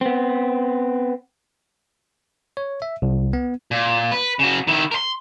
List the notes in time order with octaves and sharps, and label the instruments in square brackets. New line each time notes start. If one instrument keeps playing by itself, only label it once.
[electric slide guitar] B3 C4
[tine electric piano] C#5
E5
C2
B3
[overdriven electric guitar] A#2
B4
C#3 F#4
D#3 E4
A#4 C6